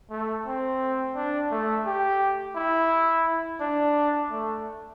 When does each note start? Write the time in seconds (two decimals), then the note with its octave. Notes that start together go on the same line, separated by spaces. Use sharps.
0.11 A3
0.46 C4
1.16 D4
1.51 A3
1.86 G4
2.55 E4
3.60 D4
4.30 A3